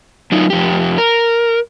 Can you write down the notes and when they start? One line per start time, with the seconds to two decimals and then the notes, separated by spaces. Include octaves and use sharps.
0.32 F#3 D#4 F4
0.50 F2 G4
0.98 A#4